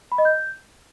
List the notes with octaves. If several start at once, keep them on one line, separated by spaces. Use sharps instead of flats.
B5
D#5
G6